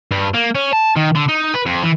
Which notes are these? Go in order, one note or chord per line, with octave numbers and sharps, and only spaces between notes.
G2
A#3
C#4
A5
D#3
D3
D#4
B4
F2
E3